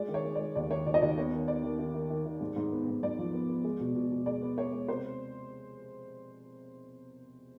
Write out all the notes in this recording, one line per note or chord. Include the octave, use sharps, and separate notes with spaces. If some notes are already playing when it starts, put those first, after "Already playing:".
Already playing: G#3 D5
D#3
C#5
G#3
G#3 D5
D#2 D5
D#3 C#5
D#2 D5
D#5
D#2 D5
B3 C#5
D#3
B3 D5
D#3
D#3
D#3
D#3
D#3
G#2
G#2
B3
G#2
G#2 D5
F3
B3
B3
G#3
B2
B2
B2
G#3 D5
B3
B3 C#5
G#3
C3 C5